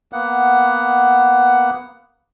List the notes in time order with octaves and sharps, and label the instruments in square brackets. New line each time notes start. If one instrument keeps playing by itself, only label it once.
[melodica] A#3 B3 F#5